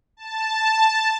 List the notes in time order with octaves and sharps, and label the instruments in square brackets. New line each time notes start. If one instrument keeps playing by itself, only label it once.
[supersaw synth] A5